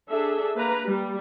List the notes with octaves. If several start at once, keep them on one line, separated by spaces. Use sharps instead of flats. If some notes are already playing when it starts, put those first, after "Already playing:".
D4 G#4 A4 E5
A#3 B4 A#5
G3